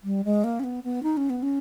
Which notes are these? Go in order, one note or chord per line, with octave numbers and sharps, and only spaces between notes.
G3
G#3
A#3
C#4
B3
B3
D#4
C#4
B3
C#4